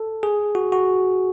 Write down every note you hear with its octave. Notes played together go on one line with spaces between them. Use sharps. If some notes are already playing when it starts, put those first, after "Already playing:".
Already playing: A4
G#4
F#4
F#4